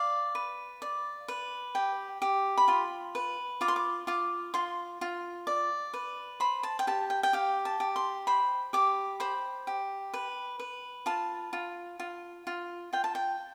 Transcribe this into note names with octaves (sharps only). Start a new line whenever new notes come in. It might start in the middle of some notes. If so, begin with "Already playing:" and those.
Already playing: D5 F5
B4
D5
B4
G4 G5
G4
B5
F4 C6
B4
F4 D6
C6
D6
F4 D6
F4 C6
F4
D5
B4
C5 B5
A5
G5
G4 A5
G5
G5
G4 F5
A5
G4
C6
C5 B5
G4 D6
C5 B5
G4
B4
B4
F4 A5
F4
F4
F4
F4 G5
A5
G5